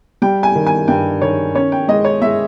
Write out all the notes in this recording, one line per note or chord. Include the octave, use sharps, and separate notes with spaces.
G3 G5
G#5
D#3
G#5
G2 G5
D#3 C#5
C#4 C#5
G5
G#3 D#5
C#5
G#3 E5